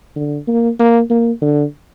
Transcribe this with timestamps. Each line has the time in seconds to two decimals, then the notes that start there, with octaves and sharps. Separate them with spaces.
0.16 D3
0.48 A#3
0.79 A#3
1.10 A#3
1.42 D3